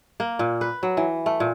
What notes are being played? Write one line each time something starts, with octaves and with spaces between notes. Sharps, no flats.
A#3
A#2
B4
F#3
E3
A3
A#2